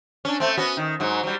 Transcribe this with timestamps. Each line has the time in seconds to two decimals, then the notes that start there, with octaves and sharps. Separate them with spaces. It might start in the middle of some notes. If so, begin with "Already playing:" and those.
0.25 C#4 D4
0.40 A3 C4
0.57 B3 C#4 F#4
0.77 D#3
1.00 G#2 F#3
1.23 F#3 G3